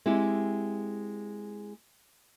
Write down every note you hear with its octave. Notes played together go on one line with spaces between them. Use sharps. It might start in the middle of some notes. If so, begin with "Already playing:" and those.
G#3 C4 E4 G4